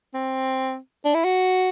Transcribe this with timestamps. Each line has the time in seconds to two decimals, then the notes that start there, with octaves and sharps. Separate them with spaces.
0.14 C4
1.05 D4
1.15 E4
1.25 F#4